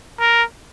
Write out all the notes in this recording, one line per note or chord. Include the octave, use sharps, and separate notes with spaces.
A#4